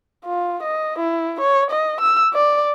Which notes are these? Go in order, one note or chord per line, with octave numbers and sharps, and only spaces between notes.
F4
D#5
E4
C#5
D#5
E6
D5